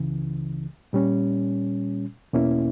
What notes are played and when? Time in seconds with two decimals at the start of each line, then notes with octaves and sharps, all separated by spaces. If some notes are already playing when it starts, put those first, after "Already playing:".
Already playing: C#2 C#3 E3
0.93 A#2 G3 C#4
2.33 E2 B2 A#3 C#4 E4